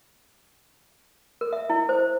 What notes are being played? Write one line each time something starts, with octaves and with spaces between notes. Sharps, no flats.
A#4
E5
E4
C5